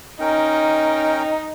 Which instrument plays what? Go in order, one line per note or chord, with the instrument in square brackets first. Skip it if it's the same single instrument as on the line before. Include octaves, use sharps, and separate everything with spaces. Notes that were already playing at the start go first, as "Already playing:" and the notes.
[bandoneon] C#4 A#4 G5 [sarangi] D#4